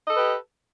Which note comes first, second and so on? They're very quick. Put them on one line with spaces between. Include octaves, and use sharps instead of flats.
D#5 A4 B4 G4